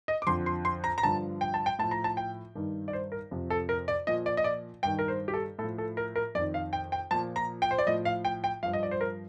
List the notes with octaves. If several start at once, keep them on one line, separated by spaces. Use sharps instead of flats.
D#5
D6
F2 D3 F3 C6
C6
C6
A#5
A#5
G2 D3 F3 A5
G5
A5
G5
A2 F3 A5
A#5
A5
G5
G2 D#3
D5
C5
A#4
F2 C3 F3
A4
A#4
D5
A#2 F3 D#5
D5
D#5
D5
G2 D#3 G5
A#4
C5
G4
A4
A2 A4
F3
A4
A#4
A#4
F2 D#3 D5
F5
G5
G5
A#2 F3 A5
A#5
G5
C5
D5
A2 F3 D#5
F5
G5
G5
G2 F3 F5
D#5
D5
C5
A#4